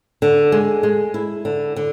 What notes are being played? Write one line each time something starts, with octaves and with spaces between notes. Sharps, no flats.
D3
G#3
G#3
E4
D3
D3